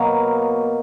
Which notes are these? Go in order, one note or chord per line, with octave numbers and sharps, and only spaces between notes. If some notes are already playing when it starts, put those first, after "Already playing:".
Already playing: B2 F#3 A#3 D#5 F5